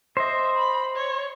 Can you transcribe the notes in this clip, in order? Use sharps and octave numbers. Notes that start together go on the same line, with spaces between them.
C5 D#5 E5
B5
C#5